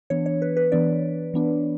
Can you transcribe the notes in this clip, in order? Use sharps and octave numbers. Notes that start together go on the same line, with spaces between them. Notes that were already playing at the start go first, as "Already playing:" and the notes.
E3 B3 D4 C#5
C#5
B4
B4
E3 B3 D4 D5
E3 B3 D4